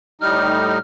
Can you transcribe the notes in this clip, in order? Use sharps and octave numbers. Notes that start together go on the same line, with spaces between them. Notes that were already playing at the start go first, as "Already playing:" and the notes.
A2 G3 D#4 F6